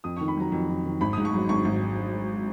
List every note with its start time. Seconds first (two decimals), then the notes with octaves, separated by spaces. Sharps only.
0.04 F2 D#6
0.17 D#3 C#6
0.28 B5
0.37 F#3 A#5
0.52 F2
0.69 F2
0.85 D#3
1.01 G#1 B5
1.13 G#2 D#6
1.25 C#6
1.33 F#3
1.49 G#1 C#6
1.65 G#1